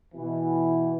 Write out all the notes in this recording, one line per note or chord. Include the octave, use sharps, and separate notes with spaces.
B2 E3